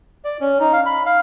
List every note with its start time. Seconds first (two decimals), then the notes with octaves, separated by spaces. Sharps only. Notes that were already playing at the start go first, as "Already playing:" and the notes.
0.25 D5
0.41 C#4
0.60 D#4
0.73 F5
0.86 B5
1.06 F5